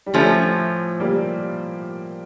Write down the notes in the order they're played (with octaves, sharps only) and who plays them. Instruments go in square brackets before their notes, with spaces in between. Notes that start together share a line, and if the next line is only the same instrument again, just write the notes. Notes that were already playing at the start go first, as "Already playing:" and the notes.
[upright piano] G3
[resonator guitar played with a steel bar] A2 F3 C#4 [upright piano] A3
[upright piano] G3 A#3